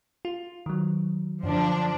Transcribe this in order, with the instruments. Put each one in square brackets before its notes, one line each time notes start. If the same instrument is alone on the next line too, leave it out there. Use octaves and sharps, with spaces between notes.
[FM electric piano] F4
D#3 F#3
[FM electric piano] F#2 D3 [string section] F3 D4